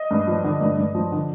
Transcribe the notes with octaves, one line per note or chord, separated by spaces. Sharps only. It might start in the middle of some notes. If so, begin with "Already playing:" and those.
Already playing: D#5
G2
F3
D3
G2
G2
F3
D3